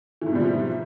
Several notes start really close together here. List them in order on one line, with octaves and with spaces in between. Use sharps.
E3 G#2 B2 G3 F3